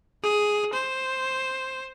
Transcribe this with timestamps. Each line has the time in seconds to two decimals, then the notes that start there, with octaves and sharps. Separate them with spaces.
0.23 G#4
0.73 C5